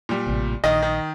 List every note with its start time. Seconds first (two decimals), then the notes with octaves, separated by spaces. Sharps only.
0.09 A#2 G3
0.26 A1 C3
0.64 A#1 D#3 D#5
0.83 D#3